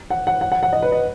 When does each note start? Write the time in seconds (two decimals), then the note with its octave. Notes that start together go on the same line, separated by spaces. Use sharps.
0.10 F#5
0.27 F#5
0.41 F#5
0.52 F#5
0.63 F#5
0.73 D#5
0.82 B4
0.92 D#5